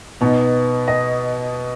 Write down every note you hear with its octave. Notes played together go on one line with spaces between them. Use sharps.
B2 B3 D#4
D#5